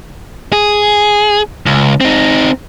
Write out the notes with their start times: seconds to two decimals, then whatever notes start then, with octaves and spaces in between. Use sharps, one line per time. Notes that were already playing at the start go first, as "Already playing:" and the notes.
0.52 G#4
1.66 C#2
2.01 C4 D#4